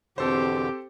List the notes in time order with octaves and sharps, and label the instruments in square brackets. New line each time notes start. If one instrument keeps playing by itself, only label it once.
[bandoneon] E2 B2 D3 [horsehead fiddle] C4 [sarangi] G4 [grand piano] A4 C5